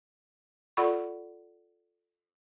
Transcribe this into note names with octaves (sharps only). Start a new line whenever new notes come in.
F4 A4 D5 F#5 B5 C#6